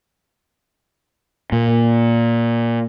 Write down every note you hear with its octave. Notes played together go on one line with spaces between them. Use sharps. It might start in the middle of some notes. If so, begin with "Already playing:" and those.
A#2